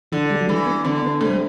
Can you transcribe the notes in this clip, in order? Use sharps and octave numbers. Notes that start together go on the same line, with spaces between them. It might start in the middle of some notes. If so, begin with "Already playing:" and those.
D3 E3
G3
F#3
E3 G3
B3
D3 C4
B3
C3 A3
G3